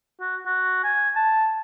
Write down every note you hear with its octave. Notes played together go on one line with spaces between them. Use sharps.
F#4
F#4
G#5
A5